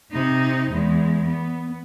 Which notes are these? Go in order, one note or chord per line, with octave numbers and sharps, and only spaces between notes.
C3 D#4
E2 G#3
B3